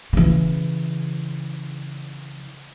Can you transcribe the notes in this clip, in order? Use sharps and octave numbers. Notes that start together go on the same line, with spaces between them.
C#3 E3